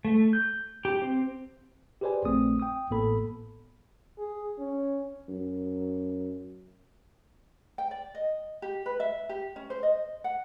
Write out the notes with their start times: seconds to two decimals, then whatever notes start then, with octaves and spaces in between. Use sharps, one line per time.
0.05 A3
0.33 G6
0.85 G4
1.02 C4
2.01 G4 G#4 B4 C5 D5 G#5
2.25 A#1 A3 C4 D#6
2.60 G5 D#6
2.90 A1 A2 A#3 B3 A4 B5
4.18 G#4
4.58 C#4
5.29 F#2
7.78 G5
7.91 D5
8.15 D#5
8.62 G4
8.86 B4
9.00 E5
9.29 G4
9.56 C#4
9.70 C5
9.83 D#5
10.24 F#5